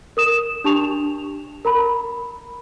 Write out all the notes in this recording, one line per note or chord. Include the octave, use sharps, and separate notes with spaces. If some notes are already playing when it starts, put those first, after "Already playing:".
A#4 D#6 E7
D4 G4 A5 C#6 F7
A#4 A#5 B5